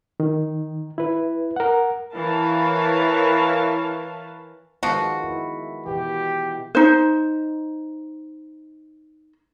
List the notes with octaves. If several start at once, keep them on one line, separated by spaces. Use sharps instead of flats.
D#3
E4 B4
A#4 F#5
E3 A#4 B4 C#5 F5 A5
D#3 F3 G#3 B3 F#4
E4
B2 E3 G4
D#4 C5